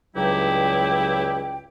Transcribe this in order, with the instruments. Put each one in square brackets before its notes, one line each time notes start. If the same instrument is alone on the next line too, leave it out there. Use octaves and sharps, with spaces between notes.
[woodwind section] C#2 G2 F#3 E4 G4 G5